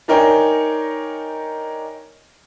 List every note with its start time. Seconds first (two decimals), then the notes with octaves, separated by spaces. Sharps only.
0.08 D4 D#4 A#4 C#5 G5 G#5